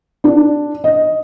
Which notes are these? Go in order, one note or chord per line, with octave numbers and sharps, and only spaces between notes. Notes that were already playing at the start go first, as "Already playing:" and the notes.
D4
D#5